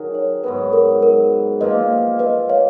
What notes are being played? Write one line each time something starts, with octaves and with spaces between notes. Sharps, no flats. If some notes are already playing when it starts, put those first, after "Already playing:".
Already playing: D#3 F#3 G#4 A#4
C#5
G#2 F#3 B3 B4
A#4
A#4
A#2 F3 A#3 B4 D#5
B4 D#5
C#5 F5